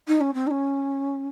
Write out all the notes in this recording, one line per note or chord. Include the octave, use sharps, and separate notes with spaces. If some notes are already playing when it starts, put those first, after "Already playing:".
D#4
C#4
C4
D#4
C#4